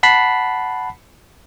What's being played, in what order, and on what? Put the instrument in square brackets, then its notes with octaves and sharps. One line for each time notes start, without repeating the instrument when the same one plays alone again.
[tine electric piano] F#5 A5 B5 B6 C7